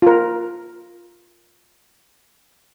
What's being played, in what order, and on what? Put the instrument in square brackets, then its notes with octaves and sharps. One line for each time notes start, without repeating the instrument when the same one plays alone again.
[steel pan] F4 A#4